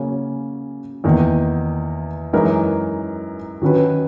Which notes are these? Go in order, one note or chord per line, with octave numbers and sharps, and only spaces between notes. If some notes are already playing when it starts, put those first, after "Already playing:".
Already playing: C#3 F#3 A#3 C#4
E2 D#3 A#3
F#2 E3 G#3 D#4 A#4
D#3 F#3 C#4 F#4 B4